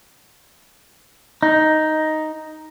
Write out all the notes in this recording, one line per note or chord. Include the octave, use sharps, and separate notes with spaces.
D#4